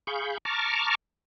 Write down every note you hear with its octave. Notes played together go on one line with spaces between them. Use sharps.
G#4 F5 B5 C#6 G6
A5 A#5 C#6 D6 F6